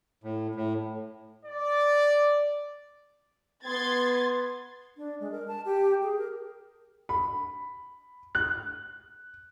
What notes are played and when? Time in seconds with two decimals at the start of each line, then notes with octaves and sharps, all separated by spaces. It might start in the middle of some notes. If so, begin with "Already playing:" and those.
0.24 A2
0.55 A2
1.46 D5
3.65 B3 C6 G#6 A6
4.97 D4
5.20 G#3
5.32 A#4
5.48 A5
5.65 G4
6.03 G#4
6.18 A#4
7.09 B5
8.35 F#6